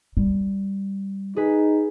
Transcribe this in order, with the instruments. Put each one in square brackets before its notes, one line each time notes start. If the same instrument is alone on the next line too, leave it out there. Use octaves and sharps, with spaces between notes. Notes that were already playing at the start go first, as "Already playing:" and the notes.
[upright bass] G3
[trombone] D#4 [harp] G#4 B4 B6